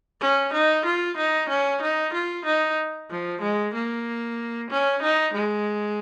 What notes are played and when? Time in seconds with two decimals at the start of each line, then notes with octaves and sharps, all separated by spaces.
0.21 C#4
0.53 D#4
0.85 F4
1.17 D#4
1.49 C#4
1.82 D#4
2.13 F4
2.45 D#4
3.10 F3
3.42 G#3
3.74 A#3
4.70 C#4
5.02 D#4
5.34 G#3